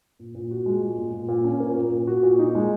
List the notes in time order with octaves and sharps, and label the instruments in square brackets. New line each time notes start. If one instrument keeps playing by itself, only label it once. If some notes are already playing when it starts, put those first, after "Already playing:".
[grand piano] A#2
A#2
F#4
G#3
A#2
A#2
A#2
A#2
C#4
A#3
A#2
A#2
F#4
A#2
D#4
G#3